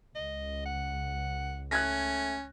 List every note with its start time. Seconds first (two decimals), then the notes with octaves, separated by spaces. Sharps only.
0.15 C#2 D#5
0.65 F#5
1.71 A3 C#4 F#6 G#6 A#6